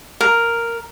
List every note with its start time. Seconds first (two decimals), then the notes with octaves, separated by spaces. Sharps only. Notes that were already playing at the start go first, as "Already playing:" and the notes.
0.21 A#4